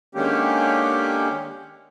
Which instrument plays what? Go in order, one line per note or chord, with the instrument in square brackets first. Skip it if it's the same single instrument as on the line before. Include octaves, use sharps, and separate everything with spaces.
[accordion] D3 D#3 G#3 A#3 C#4 G4